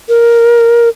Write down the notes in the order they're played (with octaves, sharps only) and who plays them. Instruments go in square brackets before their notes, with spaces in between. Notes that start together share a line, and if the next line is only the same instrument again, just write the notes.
[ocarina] A#4